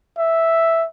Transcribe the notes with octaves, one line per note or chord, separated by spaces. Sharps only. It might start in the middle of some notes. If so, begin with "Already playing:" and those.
E5